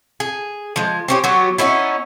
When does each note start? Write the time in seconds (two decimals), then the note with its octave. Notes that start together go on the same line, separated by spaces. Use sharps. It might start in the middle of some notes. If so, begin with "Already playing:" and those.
0.20 G#4
0.76 F3 G#3
1.08 C4 C#4 G4
1.24 F#3 B3 F#4 G4
1.58 B3 C#4 D#4 E4